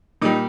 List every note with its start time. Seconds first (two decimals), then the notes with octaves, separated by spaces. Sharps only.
0.22 A#2 G3 D#4